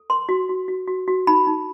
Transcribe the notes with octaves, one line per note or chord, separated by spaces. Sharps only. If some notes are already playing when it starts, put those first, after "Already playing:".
Already playing: A4
A#4 C6
F#4
F#4
F#4
F#4
F#4
D#4 B5
D#4